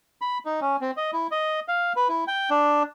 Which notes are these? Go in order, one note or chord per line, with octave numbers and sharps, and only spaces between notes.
B5
D#4
C#4
C4
D#5
E4
D#5
F5
B4
E4
G5
D4